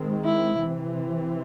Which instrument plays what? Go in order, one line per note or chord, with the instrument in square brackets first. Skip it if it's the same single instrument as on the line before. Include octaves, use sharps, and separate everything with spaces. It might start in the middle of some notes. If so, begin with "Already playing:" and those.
Already playing: [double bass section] D#3 G#3 C4
[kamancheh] E4
[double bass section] C3 E3 C4